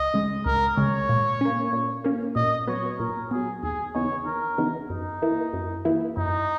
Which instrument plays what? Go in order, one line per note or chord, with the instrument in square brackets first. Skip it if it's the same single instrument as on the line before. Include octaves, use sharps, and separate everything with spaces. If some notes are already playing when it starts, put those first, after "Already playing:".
Already playing: [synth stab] C#2 [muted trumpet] D#5
[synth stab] C#3 G#3
[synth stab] C#2 [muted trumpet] A#4
[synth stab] C#3 G#3 [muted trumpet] C#5
[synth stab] A#2
A#3 C#4
A#2
A#3 C#4
[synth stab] A#2 [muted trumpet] D#5
[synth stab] F#3 B3 [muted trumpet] C#5
[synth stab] A#2 [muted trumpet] A#4
[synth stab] F#3 B3 [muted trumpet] G#4
[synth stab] D#2 [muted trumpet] G#4
[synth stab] C#3 E3 B3 D#4 [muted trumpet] C#5
[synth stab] D#2 [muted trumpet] A#4
[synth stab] C#3 E3 B3 D#4
[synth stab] F#2 [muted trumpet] D#4
[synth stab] E3 A#3 E4
F#2
E3 A#3 E4
[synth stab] F#2 [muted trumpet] D#4